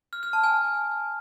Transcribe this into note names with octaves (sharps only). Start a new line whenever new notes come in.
F6
F6
A5
G#5